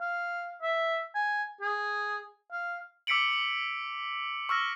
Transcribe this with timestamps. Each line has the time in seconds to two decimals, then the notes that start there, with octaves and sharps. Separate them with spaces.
0.01 F5
0.62 E5
1.15 G#5
1.61 G#4
2.52 F5
3.07 D6 E6 B6 C#7 D7 F#7
3.33 F#7
4.49 C#6 E6 F6 A#6